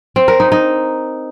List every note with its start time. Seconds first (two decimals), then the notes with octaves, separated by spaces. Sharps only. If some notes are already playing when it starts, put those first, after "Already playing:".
0.16 C4
0.28 A#4
0.40 D#4
0.52 D#4